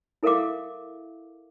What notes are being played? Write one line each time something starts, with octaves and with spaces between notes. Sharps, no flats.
E4 A4 A#4 E5 F5 D6